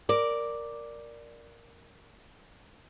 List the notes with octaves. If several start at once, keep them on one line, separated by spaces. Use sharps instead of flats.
A#4 D5